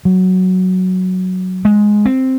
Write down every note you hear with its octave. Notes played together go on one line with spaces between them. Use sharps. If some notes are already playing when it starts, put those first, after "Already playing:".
F#3
G#3
C4